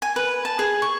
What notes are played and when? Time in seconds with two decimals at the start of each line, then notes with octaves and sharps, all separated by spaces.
0.02 G#5
0.16 B4
0.45 A5
0.59 G#4
0.82 C#6